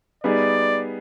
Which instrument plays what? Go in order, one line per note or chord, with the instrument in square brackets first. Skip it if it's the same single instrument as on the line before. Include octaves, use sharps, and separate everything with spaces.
[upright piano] G3 B3 D#4 G#4 [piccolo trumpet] D5